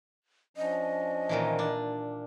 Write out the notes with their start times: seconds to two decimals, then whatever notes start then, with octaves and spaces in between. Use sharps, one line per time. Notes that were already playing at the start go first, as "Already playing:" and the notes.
0.57 F3 C#4 D4 D#5
1.29 A#2 D#3 E3
1.59 D4